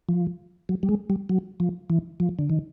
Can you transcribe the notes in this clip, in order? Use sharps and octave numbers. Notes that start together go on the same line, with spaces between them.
F3
F#3
G3
G#3
G3
F#3
F3
E3
F3
D3
D#3